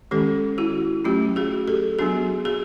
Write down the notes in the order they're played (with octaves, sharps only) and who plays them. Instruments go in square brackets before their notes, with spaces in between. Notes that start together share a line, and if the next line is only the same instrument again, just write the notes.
[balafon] D#3 G#3 C#4 G4 A4
E4 F#4
F#3 A3 C#4 F4 G4
F#4 G#4
G4 A4
F#3 B3 D4 F#4 G#4
F#4 G#4